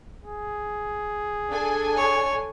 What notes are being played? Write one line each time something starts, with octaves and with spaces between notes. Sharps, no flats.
G#4
D4 A4 G#5
C#5